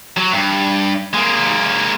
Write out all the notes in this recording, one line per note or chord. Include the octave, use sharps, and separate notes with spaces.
F#3
G2
G#3 A#3